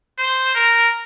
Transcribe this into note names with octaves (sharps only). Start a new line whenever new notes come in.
C5
A#4